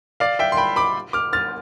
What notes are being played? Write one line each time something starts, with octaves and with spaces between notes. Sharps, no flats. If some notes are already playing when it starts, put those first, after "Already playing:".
D5 F5
E5 G5
C6
G5 B5
B5 D6
D6 F6
F6 A6